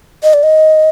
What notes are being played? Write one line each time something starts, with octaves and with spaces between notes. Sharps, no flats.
D#5
D5
D#5